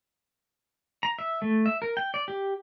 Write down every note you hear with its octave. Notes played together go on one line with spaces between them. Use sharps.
A#5
E5
A3
E5
A#4
G5
D5
G4